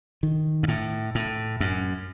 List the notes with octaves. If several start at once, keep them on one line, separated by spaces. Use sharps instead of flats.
D#3
G2
A2
A2
F#2